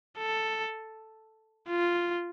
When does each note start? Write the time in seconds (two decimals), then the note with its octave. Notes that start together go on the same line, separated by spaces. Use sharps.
0.18 A4
1.68 F4